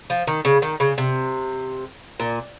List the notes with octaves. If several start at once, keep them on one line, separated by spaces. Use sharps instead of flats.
F3
D#3
C#3
D#3
C#3
C3
A#2